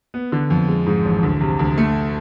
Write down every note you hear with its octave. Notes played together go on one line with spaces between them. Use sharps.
B3
D3
F2
G#3
G#2
A1
D2
C3
D2
A3